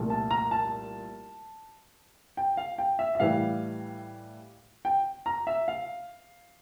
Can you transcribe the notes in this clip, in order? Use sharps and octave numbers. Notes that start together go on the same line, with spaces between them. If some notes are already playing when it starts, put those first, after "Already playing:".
Already playing: C2 A#2 F3 A3
A5
A#5
A5
G5
F5
G5
E5
E5
A2 E3 G3 F5
G5
A#5
E5
F5